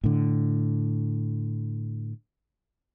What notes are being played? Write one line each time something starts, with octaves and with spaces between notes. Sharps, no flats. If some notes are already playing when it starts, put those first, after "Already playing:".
A2 D3